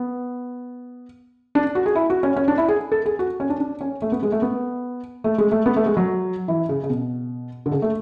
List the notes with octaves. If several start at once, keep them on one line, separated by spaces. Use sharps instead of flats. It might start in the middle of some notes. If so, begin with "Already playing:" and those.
Already playing: B3
D4
F#4
G#4
E4
F#4
C#4
C#4
D4
E4
G#4
A4
G#4
F#4
C#4
D4
D4
C#4
A3
B3
G#3
A3
B3
A3
G#3
A3
B3
A3
G#3
F#3
E3
C#3
C#3
B2
D3
C#3
A3